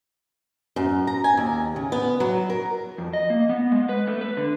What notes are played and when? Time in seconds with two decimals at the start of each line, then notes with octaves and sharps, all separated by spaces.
0.76 F#2
1.07 A#5
1.24 G#5
1.37 D#2
1.76 C#3
1.92 B3
2.20 F#3
2.50 A#4
2.98 F2
3.13 D#5
3.30 A#3
3.49 B3
3.72 G#3
3.89 B4
4.07 A3
4.21 B4
4.37 D3